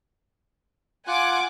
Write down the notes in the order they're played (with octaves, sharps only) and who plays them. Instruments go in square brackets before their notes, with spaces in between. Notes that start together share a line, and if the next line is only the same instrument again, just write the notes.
[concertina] F4 F#6 [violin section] F#5 G#5 D6